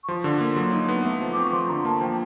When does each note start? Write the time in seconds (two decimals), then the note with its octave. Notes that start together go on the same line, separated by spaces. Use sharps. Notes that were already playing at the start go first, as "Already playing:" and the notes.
0.04 C#6
0.08 F3 C6
0.24 D3
0.40 A#3
0.56 F#3
0.73 D#4
0.89 B3
1.05 A3
1.21 F3
1.33 C4 D6
1.43 C#6
1.53 F3 C6
1.69 D3 A#5
1.85 A#3 A5
2.01 F3 G5